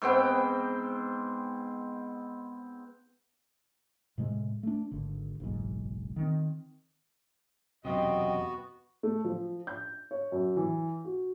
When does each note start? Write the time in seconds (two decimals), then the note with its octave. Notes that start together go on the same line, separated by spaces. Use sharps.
0.02 G#2 B3 C4 G5
4.18 A2 C3 G#3
4.63 A3 D4
4.91 G#1 D3
5.40 F#1 B1 G#2
6.16 D#3 C4
7.85 E1 F#2 C3 B3 F4 F#4 D#5 G5
9.03 A3
9.24 F3
9.67 G6
10.11 C#5
10.32 F#2
10.57 E3
11.05 F#4